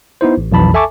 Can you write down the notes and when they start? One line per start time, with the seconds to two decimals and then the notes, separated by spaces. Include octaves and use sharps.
0.21 B3 D#4 E4 C5
0.37 A1
0.52 B1 F2 E3 A5 B5
0.74 A4 E5 G#5 A5 C#6 D6